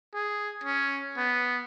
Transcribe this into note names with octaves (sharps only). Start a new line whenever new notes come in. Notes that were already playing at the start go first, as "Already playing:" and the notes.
G#4
C#4
B3